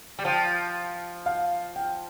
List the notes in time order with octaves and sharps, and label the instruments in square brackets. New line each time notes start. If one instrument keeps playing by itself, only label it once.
[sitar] G3
[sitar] F3 [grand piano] G5
[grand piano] F5
G5